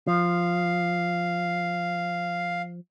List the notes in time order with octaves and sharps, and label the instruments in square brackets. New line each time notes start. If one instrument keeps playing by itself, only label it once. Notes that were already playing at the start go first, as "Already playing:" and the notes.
[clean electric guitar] F3 [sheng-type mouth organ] F5